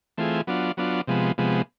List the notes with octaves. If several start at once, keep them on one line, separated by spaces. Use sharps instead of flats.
E3 A3 C4 F4 G#4
F#3 B3 D4 F4
F#3 B3 D4 F4
C3 F3 G#3 B3
C3 F3 G#3 B3